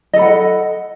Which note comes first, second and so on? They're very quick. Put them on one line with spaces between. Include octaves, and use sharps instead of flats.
D#5 A4 B5 F#5